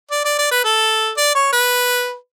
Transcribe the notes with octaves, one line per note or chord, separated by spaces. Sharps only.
D5
D5
D5
B4
A4
D5
C#5
B4